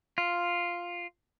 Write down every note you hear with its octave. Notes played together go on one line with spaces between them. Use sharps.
F4